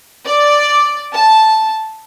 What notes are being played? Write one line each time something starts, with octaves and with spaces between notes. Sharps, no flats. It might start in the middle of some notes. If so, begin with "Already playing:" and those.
D5
A5